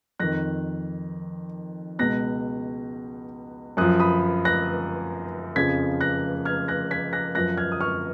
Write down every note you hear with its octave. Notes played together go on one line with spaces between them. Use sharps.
F2 D#3 F#6 A#6
C#2 B2 F#6 A#6
F#2 F3 D#6 F#6
B5 D#6
F#6 A#6
F2 C#3 F3 G#6 B6
F#6 A#6
F6 G#6
F#6 A#6
G#6 B6
F#6 A#6
F#2 F3 F#6 A#6
F6 G#6
D#6
C#6 F6